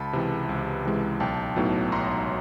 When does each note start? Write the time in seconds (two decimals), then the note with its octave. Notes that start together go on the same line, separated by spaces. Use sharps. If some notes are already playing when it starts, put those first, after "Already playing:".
Already playing: C#2 A5 B5
0.13 C3 E3 G#3
0.49 C#2
0.85 C3 E3 G#3
1.20 B1 G5 A5
1.56 A2 F#3 B3 D#4
1.92 B1 A#5 C6